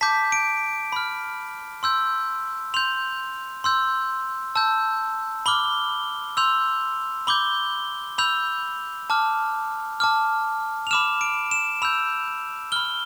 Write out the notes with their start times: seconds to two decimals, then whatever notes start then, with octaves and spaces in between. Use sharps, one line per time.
0.01 A5 D6 G6 B6
0.32 D7
0.92 B5 F6
1.83 C6 E6 G6
2.74 C6 G6 F7
3.64 C6 E6 G6
4.55 A5 E6 G6
5.46 B5 D6 F6 G7
6.37 C6 E6 G6 F7
7.27 B5 D6 G6 G7
8.18 B5 E6 G6 F7
9.10 A5 D6 F6
10.00 A5 D6 F6
10.87 F7
10.91 B5 D6 F6 E7
11.21 D7
11.51 E7
11.82 B5 E6 G6 F7
12.72 B5 F6 G7